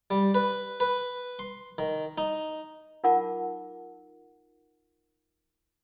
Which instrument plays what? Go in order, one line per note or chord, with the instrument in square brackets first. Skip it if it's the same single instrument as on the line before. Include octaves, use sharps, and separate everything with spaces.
[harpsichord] G3
B4
B4
C6
D#3
D#4
[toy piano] D#4 F4 A#4 F#5 A5 D6